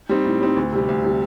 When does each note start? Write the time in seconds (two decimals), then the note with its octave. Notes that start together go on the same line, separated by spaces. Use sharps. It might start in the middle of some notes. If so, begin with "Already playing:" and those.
0.09 G3 C4 D#4
0.25 A2
0.41 G3 C4 D#4
0.57 D2
0.72 C3 G3
0.89 D2
1.04 C3 G3